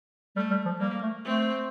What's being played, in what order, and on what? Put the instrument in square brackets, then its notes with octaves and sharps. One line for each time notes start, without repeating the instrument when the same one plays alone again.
[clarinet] G3 [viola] A3
[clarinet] G3
F3
[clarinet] G3 [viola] A#3
[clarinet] A3
[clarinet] A3 [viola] C4